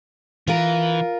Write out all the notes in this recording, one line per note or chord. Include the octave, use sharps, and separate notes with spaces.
E3 F4 A#4